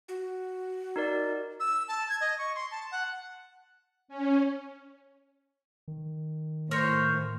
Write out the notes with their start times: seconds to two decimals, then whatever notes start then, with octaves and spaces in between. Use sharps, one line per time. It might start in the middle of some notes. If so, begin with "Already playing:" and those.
0.08 F#4
0.96 D#4 A#4 D5
1.60 E6
1.88 A5
2.09 G#6
2.21 D#5
2.38 C#6
2.55 C6
2.71 A5
2.92 F#5
4.08 C#4
5.88 D#3
6.71 A2 A#4 C5 C#5